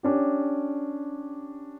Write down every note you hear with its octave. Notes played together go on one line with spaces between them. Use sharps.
C#4 D4 G4